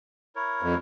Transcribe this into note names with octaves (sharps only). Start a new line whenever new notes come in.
E4 A#4 C#5
F2